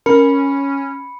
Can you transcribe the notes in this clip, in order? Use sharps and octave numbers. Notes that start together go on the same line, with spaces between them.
C#4 A#4 B5 C#7